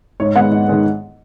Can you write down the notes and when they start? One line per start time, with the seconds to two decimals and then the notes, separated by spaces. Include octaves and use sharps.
0.20 G#2 C#5
0.35 D#3 G#3 B3 F#5
0.51 G#2
0.68 D#3 G#3 B3